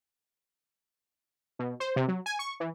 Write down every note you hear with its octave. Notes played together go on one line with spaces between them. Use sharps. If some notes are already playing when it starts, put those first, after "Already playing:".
B2
C5
C3
F#3
G#5
C#6
E3